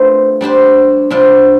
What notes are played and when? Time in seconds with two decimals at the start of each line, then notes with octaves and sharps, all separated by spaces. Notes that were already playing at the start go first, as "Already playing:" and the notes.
Already playing: A3 C4 D4 F4 B4
0.41 G3 D4 G4 C5
1.10 C3 G3 D4 F4